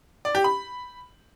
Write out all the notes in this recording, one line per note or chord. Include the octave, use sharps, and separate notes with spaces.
D5
G4
B5